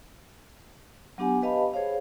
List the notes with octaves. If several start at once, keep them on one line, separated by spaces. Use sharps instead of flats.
F#3 B3 D4 G4 F#5 G#5
G4 B4 D#5 F5 A5 B5
G#4 C5 C#5 F5